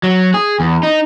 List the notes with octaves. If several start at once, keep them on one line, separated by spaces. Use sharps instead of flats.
F#3
G#4
E2
D#4